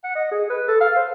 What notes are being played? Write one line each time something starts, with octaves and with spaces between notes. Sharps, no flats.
F#5
D#5
G#4
B4
A4
F5
C5